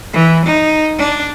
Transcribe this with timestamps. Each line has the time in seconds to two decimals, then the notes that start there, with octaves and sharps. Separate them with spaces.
0.13 E3
0.46 D#4
0.99 D4